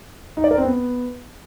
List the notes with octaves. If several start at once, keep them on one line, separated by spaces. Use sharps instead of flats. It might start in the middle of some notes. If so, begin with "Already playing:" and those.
D#4
D5
A#4
C4
B3